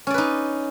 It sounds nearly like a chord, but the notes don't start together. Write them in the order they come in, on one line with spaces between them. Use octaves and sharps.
C#4 D5 B4 D#4